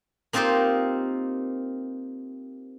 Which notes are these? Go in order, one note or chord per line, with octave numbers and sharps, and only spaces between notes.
A#3 C4 D#4 F4 G4 C5